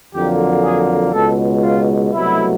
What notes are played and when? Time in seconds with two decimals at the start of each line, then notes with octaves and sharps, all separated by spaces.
0.14 F2 D3 F#3 A#3 G4
0.64 G#4
1.13 C#2 B2 G#3 A4
1.63 F4
2.13 C2 B2 F#3 A3 E4